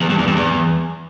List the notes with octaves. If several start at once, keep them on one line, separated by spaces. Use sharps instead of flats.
E2
G2
E2
G2
E2